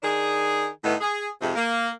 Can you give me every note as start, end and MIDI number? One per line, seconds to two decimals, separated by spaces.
0.03 0.67 51
0.03 0.67 62
0.03 0.67 68
0.84 0.95 45
0.84 0.95 51
0.84 0.95 57
0.84 0.95 59
0.84 0.95 63
1.01 1.28 68
1.41 1.54 41
1.41 1.54 44
1.41 1.54 48
1.56 1.89 58